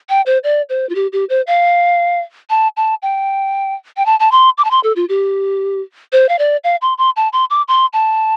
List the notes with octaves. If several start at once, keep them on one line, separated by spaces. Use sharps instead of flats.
G5
C5
D5
C5
F4
G4
G4
C5
F5
A5
A5
G5
G5
A5
A5
C6
D6
A5
C6
A4
F4
G4
C5
F5
D5
F5
C6
C6
A5
C6
D6
C6
A5